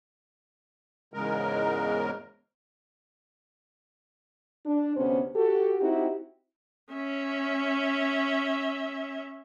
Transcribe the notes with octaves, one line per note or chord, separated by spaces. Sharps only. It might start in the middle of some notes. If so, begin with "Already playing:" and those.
E2 G#2 C#3 G#3 A#4
D4
D2 C3 B3 C#4 C5
F#4 G4 A4
C4 D#4 E4 F#4 G4
C#4 E5